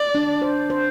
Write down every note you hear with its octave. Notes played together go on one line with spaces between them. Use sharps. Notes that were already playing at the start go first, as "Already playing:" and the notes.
Already playing: D5
D4
C5
C5